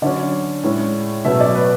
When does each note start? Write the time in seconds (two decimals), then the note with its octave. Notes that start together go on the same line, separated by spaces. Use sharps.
0.02 D3 F#3 C#4 D5
0.63 A2 G#3 C#4
1.25 B2 F#3 A3 C#4 E5
1.41 D5
1.55 B4